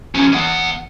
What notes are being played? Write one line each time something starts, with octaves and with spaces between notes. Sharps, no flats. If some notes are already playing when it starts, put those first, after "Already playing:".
F3 C#4
E2 F#5